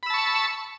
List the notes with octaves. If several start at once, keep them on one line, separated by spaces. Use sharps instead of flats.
A5 B5 C#6 E6